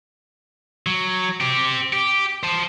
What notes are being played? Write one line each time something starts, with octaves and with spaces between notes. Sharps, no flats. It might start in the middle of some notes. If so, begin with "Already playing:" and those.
F#3
C4 G4
G4
C5 A5